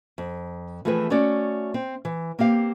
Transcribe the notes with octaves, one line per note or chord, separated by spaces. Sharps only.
F2
E3 F3 A3 C4 G#4 B4
A3 C#4 F#4 C#5 D5
C4
E3
A#3 C4 G4 F5